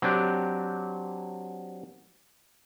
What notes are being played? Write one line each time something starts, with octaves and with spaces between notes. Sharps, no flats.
F#3 C4 D4 G4